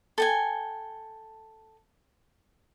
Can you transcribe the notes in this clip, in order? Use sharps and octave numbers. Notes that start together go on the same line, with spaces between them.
A4 G5 G#5